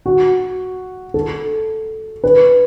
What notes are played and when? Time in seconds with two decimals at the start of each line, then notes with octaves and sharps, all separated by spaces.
0.06 F#4
1.14 A4
2.24 B4